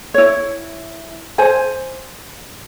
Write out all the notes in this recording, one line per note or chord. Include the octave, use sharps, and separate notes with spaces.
E4 C#5
C5 G#5